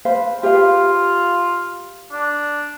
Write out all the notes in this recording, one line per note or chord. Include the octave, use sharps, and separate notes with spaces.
B4 C5 F5
F4 G4 B4 F5
D4